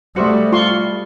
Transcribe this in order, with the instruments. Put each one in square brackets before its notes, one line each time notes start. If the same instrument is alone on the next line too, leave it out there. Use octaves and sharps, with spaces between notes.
[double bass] G3 [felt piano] A3 D#6 C#7 [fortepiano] F#4 C5 E5
[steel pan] F4 C6 C#6